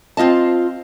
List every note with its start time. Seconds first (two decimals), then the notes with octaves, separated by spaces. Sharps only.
0.17 C4 F4 D#5 A5